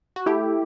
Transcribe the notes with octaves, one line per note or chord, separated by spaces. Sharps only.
F#4
A3 E4 G4